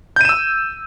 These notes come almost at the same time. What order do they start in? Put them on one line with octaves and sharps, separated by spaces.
G6 D#7 E7 E6